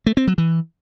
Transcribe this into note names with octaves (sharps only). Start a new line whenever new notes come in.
A3
C4
F#3
E3